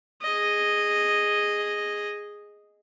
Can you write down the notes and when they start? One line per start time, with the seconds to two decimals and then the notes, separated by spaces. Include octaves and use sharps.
0.23 G#4 D#5